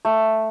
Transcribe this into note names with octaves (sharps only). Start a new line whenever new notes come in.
A3